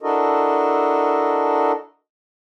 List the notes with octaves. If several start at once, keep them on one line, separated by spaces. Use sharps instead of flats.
D4 E4 F#4 A4 A#4 D#5